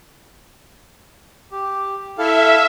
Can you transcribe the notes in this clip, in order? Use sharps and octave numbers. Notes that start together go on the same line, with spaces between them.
G4
E4 A4 E5 F5